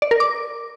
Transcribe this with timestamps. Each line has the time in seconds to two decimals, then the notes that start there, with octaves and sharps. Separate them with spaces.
0.02 D5
0.11 A#4
0.20 D6